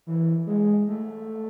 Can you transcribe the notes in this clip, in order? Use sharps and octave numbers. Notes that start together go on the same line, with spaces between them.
E3
G#3
A3